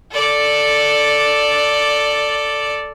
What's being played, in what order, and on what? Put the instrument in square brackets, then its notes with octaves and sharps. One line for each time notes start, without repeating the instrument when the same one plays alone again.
[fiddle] A4 D5